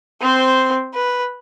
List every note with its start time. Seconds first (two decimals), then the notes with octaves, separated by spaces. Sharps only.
0.21 C4 C5
0.94 B4